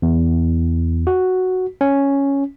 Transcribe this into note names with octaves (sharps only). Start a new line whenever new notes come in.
E2
F#4
C#4